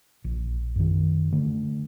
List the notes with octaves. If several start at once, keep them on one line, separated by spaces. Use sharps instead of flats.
A#1
F#2 D#3
D3 A3